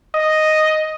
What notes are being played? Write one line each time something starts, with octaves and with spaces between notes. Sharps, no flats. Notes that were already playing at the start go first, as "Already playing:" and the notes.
D#5